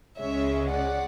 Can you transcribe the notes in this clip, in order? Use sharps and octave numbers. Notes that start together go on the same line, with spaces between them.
C#2 C#3 G#3 C#4 C#5 E5
D5 F#5